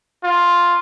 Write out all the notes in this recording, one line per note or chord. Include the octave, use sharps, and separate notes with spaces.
F4